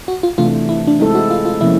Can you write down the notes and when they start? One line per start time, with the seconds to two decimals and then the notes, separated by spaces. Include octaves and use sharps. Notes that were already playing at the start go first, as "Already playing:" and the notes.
0.08 F#4
0.23 F4
0.38 C3 E3 A3 D4 F4
0.69 E4
0.87 D4
1.00 G#3 C4 D#4 E4 A4
1.15 F#4
1.31 F4
1.45 F4
1.61 C3 F3 A#3 C#4 E4